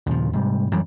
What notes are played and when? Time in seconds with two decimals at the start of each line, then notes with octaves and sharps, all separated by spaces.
0.06 D#2 A#2 C#3 F3
0.33 G#2 C3 G3
0.72 F#2 E3 G3